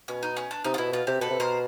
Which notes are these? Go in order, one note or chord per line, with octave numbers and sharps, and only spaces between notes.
B2 C#4
D#4
C#4
D4
C3 D#4
F4
B2 E4
B2 F4
C3 G4
B2 A4 B4
C3
B2 A#4 C5